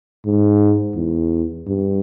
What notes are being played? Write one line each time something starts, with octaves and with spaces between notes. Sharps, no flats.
G#2
E2
G2